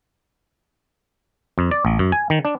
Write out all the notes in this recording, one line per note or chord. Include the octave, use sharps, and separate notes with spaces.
F2
D5
A1
F#2
G#5
D#3
D4